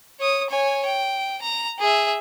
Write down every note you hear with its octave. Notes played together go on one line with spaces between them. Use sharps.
C#5 D#6
C#5 G#5
G5
A#5
G#4 E5